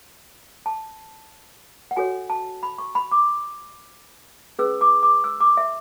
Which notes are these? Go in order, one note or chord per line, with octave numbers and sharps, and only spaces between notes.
A5
F#5
F#4 A4 C#5 G#5
A5
B5
C#6
B5
D6
C#4 G#4 B4 E6
D6
D6
E6
D6
E5